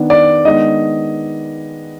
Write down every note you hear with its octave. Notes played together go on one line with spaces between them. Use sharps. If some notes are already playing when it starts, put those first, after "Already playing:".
Already playing: D#3 B3 D4
D5
D#3 G#3 B3 D4 D#5